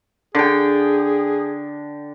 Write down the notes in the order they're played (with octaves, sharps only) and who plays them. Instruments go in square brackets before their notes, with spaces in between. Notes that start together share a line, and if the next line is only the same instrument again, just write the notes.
[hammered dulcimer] D3 G5 [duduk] G#4